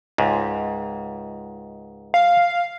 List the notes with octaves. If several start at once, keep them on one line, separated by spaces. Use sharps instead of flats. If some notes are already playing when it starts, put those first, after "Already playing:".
C#2 G#2
F5